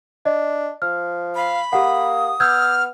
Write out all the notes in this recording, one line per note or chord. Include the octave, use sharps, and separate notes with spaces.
D4 D#5
F3 F6
F5 B5
A#3 G4 F#5 D#6
B3 E6 F6 G6 G#6